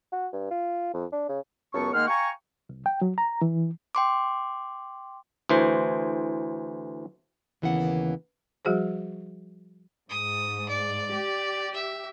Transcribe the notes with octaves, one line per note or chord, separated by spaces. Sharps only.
F#4
G2
F4
F2
D4
C#3
C#2 F#2 B3 A5 C#6
D#3 G#3 A#3 F#5 C6 F6
F5 G5 G#5 A#5 C#6
C2
G5
F#3
A#5
E3
G5 C6 D6
D2 E3 C5
D#2 C#3 E3 A#3 B3 F#5
F3 G3 F#4 G#4 C5
G#2 D#6
D5
G4
E5